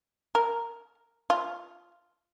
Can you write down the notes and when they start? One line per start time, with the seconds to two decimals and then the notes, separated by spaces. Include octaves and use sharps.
0.35 A#4
1.30 F4